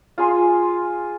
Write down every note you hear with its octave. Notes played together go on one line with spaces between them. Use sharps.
F4 G#4 G#5 C6